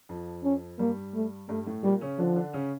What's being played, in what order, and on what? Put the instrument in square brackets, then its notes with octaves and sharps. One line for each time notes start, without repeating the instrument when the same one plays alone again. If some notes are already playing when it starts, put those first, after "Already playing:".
[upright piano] F2 F3
[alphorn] C#4
[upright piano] G2 G3 [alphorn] A#3
[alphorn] A3
[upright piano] G2 G3 [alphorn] A3
[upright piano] A2 A3
[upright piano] A#2 A#3 [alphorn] G3
[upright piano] C#3 C#4
[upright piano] D3 D4 [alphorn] F3
[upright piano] D3 D4
C#3 C#4